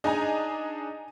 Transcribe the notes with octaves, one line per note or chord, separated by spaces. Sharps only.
D4 D#4 G#4 D#5 G#5 A#5